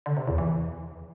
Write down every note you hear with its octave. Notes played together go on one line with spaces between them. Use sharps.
D3
C3
E2
E3